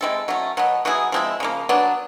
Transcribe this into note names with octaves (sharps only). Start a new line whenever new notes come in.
G#3 C4 E4 A4
F#3 A3 C#4
B2 F#3 B3
F#3 B3 E4 G#4
F3 G#3 C4 E4
C#3 F3 A#3
F#3 B3 D4